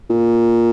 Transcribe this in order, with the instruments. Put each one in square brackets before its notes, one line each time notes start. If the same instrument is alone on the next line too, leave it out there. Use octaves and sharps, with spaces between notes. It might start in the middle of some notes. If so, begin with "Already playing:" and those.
[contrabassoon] A#2